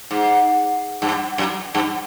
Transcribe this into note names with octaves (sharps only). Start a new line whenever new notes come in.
G#2
G2
F#2
G2